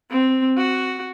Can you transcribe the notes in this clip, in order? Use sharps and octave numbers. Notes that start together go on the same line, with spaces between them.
C4
F#4